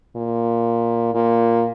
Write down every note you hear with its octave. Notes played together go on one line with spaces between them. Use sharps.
A#2
A#2